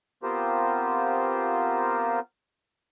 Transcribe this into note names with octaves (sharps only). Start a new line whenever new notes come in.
B3 C4 F4 G4 A#4 C5